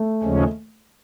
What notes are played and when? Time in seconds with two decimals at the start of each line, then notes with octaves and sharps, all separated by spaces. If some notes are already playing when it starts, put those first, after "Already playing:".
Already playing: A3
0.23 D#2 C#3 F3 G#3 C#4